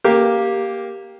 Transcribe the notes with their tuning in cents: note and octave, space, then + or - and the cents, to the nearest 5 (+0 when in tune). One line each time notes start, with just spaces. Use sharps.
A#3 +0 G4 +0